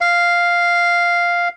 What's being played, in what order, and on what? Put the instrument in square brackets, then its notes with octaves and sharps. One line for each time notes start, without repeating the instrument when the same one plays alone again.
[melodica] F5